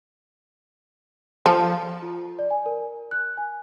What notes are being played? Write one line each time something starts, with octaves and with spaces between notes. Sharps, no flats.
F3 A4
F4
D5
G#5
A#4
F#6
G#5